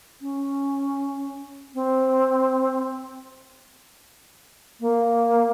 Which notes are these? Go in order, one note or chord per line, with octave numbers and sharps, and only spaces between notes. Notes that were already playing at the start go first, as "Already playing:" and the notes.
C#4
C4
A#3